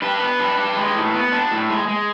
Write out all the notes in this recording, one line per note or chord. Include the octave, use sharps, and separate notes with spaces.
D4 B4
B3
D4
D4
G#3
A2
B3
D4
A2
G#3
G#3